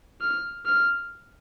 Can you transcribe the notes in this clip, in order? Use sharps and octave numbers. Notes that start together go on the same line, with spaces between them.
F6
F6